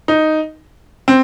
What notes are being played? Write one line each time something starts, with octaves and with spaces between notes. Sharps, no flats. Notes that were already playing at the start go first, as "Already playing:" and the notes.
D#4
C4